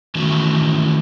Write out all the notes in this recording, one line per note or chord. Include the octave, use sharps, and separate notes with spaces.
D#3 E3 A3 C#4 E4 F#4